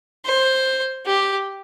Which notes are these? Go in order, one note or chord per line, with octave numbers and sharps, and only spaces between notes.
C5
G4